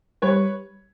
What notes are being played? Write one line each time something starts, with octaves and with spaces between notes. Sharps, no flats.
G3 B4 C#5